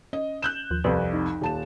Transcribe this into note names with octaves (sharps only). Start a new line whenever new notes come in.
C#4 D#5
F#6 G6 E7
D#2 F3
C2 F2 B4
D#4
D#1 A5 E7